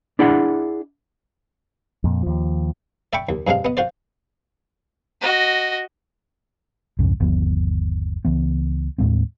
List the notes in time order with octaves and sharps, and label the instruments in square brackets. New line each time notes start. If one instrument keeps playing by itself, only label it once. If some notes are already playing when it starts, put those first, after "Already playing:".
[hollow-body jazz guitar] D4 E4 G#4 D5 E5 F#5
[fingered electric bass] F2 A#2
D#2 F3
[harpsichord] D5 E5 G5 B5 C#6 D6
D#2
G2 C3 G#3 D4 F5
B3 D#5
F4 F#4 C5 D5
[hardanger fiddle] F#4 D#5
[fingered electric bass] C2 F2 G#2 C#3
G1 D#2 F3 B3
C#2 E3 B3
D#2 A2 G#3 C4